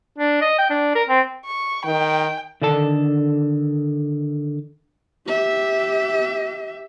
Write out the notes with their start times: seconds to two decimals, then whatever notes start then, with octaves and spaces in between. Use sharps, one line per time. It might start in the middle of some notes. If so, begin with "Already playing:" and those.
0.18 D4
0.41 D#5
0.58 G5
0.70 D4
0.95 A#4
1.09 C4
1.46 C#6
1.86 D#3 G5
2.62 D3 D#3 D4 A4 A5
5.27 G4 E5